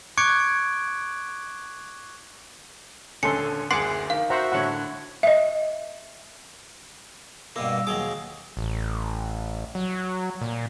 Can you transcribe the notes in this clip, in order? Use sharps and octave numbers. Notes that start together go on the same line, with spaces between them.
C#6 D6 F#6 G#6 C#7 D7
D#1 D3 C#4 A4 G#5 C6 C#7
F#1 D2 G#4 F#5 C6 D6 C7
D#3 F5
F#4 C5 E5 F#5 A#5
A2 D3 C#5 F#5
D#5 E5
G2 B2 A#3 D6 E6
D#2 F#3 G#4 D6
A1
F#3
A#2